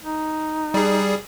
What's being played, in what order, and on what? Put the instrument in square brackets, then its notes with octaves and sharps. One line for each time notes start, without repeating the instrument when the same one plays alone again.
[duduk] D#4
[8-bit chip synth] G3 G#4